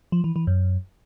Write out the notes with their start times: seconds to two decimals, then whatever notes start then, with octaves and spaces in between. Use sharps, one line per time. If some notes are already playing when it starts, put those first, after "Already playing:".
0.12 F3
0.24 E3
0.36 E3
0.47 F#2